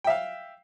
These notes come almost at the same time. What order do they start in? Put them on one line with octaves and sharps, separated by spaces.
G5 E5 F5